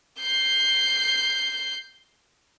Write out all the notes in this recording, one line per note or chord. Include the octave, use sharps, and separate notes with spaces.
G6 C7